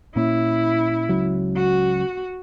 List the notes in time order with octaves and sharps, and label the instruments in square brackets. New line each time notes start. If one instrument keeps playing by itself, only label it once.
[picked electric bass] A#2 A#3 C#4 [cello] E4
[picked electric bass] C#2 C#3 F#3
[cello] F#4